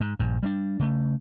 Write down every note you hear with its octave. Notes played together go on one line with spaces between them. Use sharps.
G#2
A#1 G2
G3 A3 D4
C#3 A3